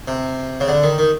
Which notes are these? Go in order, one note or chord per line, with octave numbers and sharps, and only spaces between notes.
C3
C#3
D3
D#3
D#3